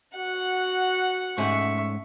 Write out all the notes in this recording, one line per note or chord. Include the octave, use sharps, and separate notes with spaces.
F#4 F#5
G#2 A3 C#4 E5 C#6